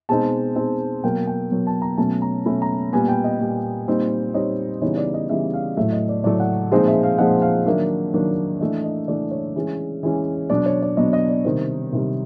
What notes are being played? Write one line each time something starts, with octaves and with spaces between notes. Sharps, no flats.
B2 G#3 C4 D#4 A5
B2 G#3 C4 D#4
B2 F#3 A#3 G5
G5
B2 F#3 A#3
A5
A#5
B2 F#3 A3 C#4 A5
A#5
B2 F#3 A3 C#4 B5
A#5
A#2 G3 B3 G#5
G5
D#5
A#2 G3 B3
A#2 G3 C4 D#4
A#2 G3 C4 D#4 C#5
C#3 E3 G3 B3 D#4 C#5
D5
D#5
C#3 E3 G3 B3 D#4 E5
F5
A2 F#3 A3 E5
D#5
D5
A2 F#3 A3 D5
F#5
A#2 F3 G#3 C4 D#4 D#5
E5
F5
A#2 F3 G#3 C4 D#4 F#5
F5
D#3 F#3 A#3 D4 E5
D#3 F#3 A#3 D4
E3 A3 D4 D#5
D#5
E3 A3 D4 D5
C#5
E3 G#3 C#4
E3 G#3 C#4
B2 F#3 B3 D4 D5
C#5
D5
B2 F#3 B3 D4 D#5
D#5
D5
C3 D#3 G3 C5
C3 D#3 G3